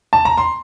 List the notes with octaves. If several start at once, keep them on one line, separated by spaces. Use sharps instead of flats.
A5
A#5
C6